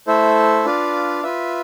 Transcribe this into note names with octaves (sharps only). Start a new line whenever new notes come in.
A3 E4 A4 C5 E5
D4 F4 B4 D5 F5
F4 B4 E5